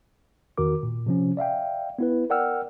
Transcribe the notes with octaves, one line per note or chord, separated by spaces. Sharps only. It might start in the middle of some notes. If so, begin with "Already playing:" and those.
E2 D#3 F#4 A#4 D6
A#2
C3 F3 C#4
D5 E5 F5 G5
B3 E4 B4
A#4 D5 F#5 G5 E6 F6